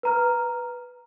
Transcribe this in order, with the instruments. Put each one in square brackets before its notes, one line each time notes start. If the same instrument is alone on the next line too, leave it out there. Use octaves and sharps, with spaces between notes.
[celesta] B4 A#5 F6